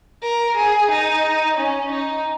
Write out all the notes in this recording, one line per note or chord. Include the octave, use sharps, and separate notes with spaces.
A#4
G#4
D#4
C#4
D#4